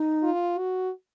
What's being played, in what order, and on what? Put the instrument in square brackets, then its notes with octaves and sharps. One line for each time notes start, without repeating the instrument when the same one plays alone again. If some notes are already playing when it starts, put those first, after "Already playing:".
Already playing: [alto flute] D#4
[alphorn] F4
F#4